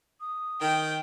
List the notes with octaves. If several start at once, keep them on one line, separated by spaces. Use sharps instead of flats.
D#6
D#3 G5